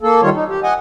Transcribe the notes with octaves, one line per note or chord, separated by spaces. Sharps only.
A#3 A4
D#3 G3 F4 C#5
D#4
G4
D#5 F#5 G#5